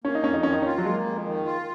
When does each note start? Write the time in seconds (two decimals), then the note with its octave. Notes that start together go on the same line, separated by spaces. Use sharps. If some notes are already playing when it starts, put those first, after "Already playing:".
0.04 A#3 C#4
0.15 D#4
0.24 F2 C#4
0.34 D#4
0.43 D#3 C#4
0.53 D#4
0.62 C#4
0.66 F4
0.78 F#3
0.85 G#3 A#3
1.06 F2
1.26 D#3
1.45 F4